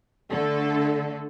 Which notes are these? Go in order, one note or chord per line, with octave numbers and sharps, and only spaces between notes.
D3 A3 A4